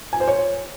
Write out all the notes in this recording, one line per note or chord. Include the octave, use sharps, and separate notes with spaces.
G#5
C5
C#5